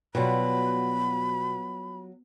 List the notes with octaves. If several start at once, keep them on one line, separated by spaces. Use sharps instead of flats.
B2 F#3 G3 F4 B5